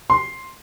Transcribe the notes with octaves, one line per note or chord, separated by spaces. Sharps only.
C6